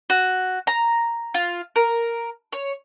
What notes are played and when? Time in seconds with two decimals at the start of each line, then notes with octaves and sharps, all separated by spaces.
0.10 F#4
0.67 A#5
1.34 F4
1.76 A#4
2.53 C#5